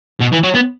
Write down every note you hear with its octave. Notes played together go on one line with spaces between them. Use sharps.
B2
E3
F#3
B3